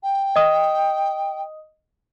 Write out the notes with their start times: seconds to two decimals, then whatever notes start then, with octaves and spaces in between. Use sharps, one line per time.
0.03 G5
0.36 D#5 D#6